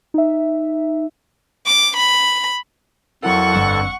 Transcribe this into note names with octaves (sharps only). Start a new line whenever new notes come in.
D#4 E5
D6
B5
F2 F#3 E4 A4 A#4 F#5 C#6
G1 G2 A5 E6